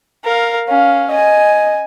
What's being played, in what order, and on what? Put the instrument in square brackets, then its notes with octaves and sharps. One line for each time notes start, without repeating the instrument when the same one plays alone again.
[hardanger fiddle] A#4 F5
[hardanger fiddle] C#4 [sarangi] F5
[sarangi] D#5 [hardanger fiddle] G#5